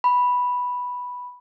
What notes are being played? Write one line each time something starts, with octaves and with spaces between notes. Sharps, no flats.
B5